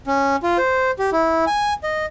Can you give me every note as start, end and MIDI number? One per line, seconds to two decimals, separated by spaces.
0.07 0.36 61
0.43 0.58 65
0.58 0.91 72
0.99 1.10 67
1.12 1.45 64
1.47 1.73 80
1.83 2.06 75